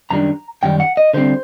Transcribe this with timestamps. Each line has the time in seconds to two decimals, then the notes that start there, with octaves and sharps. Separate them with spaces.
0.11 F#2 D#3 G3 D4 A#5
0.63 F#2 D#3 G3 G5
0.80 F#5
0.97 D#5
1.14 D3 G3 C4 C5